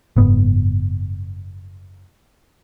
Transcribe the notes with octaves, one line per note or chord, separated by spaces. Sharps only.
F#1 G#2 B3